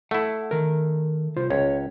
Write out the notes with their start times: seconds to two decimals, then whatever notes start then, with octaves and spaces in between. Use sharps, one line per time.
0.11 A3 E4 F#5
0.51 D#3 A#4
1.36 C2 F4 C5
1.50 C#2 C#5